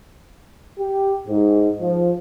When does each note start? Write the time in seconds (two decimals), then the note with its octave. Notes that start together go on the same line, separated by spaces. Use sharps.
0.80 G4
1.28 G#2
1.80 F3